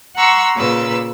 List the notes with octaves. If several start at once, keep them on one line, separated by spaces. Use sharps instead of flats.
F#5 A#5 C6 C#6 E6
A#2 C#3 B4 E6